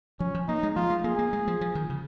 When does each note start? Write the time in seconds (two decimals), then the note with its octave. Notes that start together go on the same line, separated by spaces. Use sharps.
0.20 F3 C#4
0.35 F3
0.48 A#3 D#4
0.63 G#3
0.76 F3 F4
0.90 G#3
1.04 A#3 G#4
1.19 A#3
1.33 G#3
1.47 F3
1.61 F3
1.75 D#3
1.90 C#3